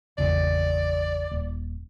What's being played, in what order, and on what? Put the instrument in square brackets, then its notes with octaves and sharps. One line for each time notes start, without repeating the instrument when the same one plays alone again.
[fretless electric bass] G#1 E2 C#3 [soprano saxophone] D5
[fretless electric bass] D#1